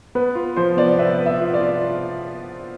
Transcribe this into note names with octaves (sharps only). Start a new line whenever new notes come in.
B3 B4
F4
F3 C5
B3 D5
B4 E5
B4
E5
F4
D5
F4